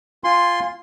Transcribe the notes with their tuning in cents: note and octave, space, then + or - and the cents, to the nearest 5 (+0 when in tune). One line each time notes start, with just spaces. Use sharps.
F4 +0 G#5 -25 C6 +0